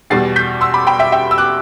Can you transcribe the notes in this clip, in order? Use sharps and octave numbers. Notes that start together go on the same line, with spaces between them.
E2 B2 G3 A6 C7
G6 B6
C6 E6
B5 D6
G5 B5
E5 G5
E5 G5
E6
D6 F#6